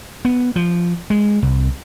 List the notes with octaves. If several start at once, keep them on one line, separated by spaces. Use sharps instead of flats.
B3
F3
G#3
C2